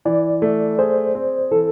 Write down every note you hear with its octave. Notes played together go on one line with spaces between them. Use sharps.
E3 D5
A3
G#4 C5
C4
E3 A4